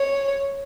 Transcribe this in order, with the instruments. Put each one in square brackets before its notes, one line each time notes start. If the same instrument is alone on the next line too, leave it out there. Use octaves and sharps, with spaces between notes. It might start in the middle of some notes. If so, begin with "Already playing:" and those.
Already playing: [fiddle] C#5